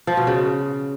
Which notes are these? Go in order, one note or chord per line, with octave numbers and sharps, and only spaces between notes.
F3
B2
C#3